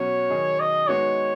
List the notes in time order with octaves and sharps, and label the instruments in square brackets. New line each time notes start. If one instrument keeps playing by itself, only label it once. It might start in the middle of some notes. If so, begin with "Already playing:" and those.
Already playing: [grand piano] B2 F#3 C#4 F#4 [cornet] C#5
[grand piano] D#3 F#3 D#4 G#4
[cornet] D#5
[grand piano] G#3 B3 D#4 F#4 [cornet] C#5